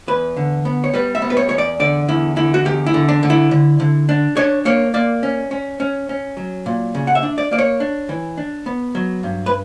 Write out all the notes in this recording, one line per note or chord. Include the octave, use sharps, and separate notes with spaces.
E2 B4
D3
B3
C#5
G3 B4
E5
B3
B4
C#5
E2 C#5
D5
D3 D5
E2 E4
D3 E4
F#4
E2 G4
E4
D3
D4
D3
E4
D3
D3
D4
D4 C#5
A#3 C#5
A#3 D5
C#4
C#4
C#4
C#4
F#3
A#2
C#3
F#5
E5
D4
D5
A#3 D5
C#5
D4
E3
D4
B3
F#3
G2
B4